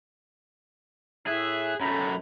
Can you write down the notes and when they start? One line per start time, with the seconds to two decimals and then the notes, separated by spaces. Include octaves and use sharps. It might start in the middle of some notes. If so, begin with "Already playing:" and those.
1.27 A2 G#4 E5 F#6
1.81 F#2 A3 A#5 B5